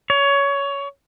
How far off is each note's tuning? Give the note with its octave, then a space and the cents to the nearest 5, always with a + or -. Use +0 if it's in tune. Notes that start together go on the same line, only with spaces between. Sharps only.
C#5 +20